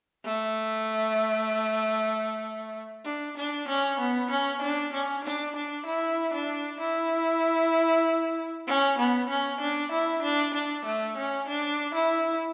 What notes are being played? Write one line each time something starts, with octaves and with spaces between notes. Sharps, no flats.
A3
D4
D4
C#4
B3
C#4
D4
C#4
D4
D4
E4
D4
E4
C#4
B3
C#4
D4
E4
D4
D4
A3
C#4
D4
E4